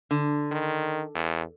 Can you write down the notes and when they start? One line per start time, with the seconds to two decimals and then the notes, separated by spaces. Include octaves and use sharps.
0.11 D3
0.52 D#3
1.15 E2